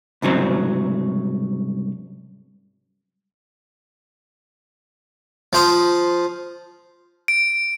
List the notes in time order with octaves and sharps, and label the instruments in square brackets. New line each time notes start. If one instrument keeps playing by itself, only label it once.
[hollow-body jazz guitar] C2 G#2 C#3 F#3 C4
[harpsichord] F3 C5 D#6
[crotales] D7